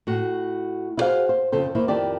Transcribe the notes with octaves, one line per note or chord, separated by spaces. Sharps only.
A2 F#4
E4 F#4 G#4 A#4 C5 F5
C5
F2 C#3 A4 C5
D#3 A#3 E4 C5
F2 D#3 E4 G4 D5 A5